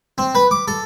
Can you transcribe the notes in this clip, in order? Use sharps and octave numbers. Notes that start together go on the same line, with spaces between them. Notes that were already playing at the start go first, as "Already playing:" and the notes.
C4
B4
D6
A4